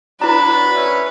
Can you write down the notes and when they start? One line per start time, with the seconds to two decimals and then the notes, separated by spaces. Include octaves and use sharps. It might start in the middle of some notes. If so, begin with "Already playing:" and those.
0.21 F#3 D4 E4 B4 A#5
0.75 C#4 E5